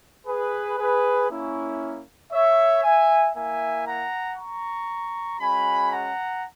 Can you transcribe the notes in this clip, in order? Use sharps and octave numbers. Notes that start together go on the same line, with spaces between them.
G#4 B4
G#4 B4
A#3 C#4 E4
C#5 E5
E5 G#5
A#3 E4 E5 G#5
F#5 A#5
A#5 C#6
G#3 C#4 F#4 G#5 B5
F#5 A#5